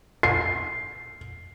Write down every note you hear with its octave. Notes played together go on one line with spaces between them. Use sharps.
C7